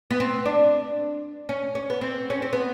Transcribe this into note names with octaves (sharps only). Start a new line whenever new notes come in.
B3
C4
D4
C#4
C#4
B3
C4
C#4
C4
B3